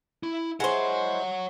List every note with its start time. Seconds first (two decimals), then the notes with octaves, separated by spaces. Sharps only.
0.23 E4
0.60 G#3 E4 C5 C#5 F#5